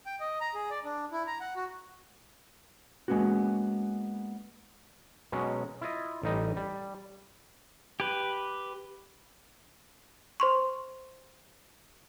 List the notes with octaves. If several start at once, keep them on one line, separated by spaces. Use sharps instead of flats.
G5
D#5
A#5
G#4
D5
D4
E4
A#5
F#5
F#4
G#3 A#3 B3 C#4 F#4
B2 F#3 G#3 C#4
E4 F4 D#5
A1 G3 D#4 D#5
G3
G4 B4
C5 C6 C#6